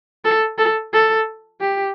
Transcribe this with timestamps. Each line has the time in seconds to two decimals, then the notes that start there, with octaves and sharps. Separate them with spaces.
0.25 A4
0.58 A4
0.93 A4
1.60 G4